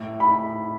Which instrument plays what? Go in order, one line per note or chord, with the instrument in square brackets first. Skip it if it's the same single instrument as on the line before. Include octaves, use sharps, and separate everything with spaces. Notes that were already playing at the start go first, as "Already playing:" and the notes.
Already playing: [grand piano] A2
[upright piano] B5